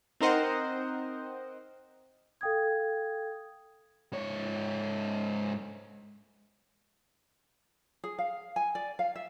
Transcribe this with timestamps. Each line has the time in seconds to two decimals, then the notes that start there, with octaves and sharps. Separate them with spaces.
0.21 C4 D#4 A#4 C5 D#5 F#5
2.41 A4 F5 G5 D#6 G#6
4.12 G#2 C#5
8.04 G#4
8.19 F5
8.56 G#5
8.75 D5
8.99 F5
9.16 E5